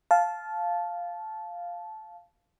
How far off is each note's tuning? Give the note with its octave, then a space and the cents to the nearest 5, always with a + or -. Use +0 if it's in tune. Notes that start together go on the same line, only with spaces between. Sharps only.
F5 +0 A5 -15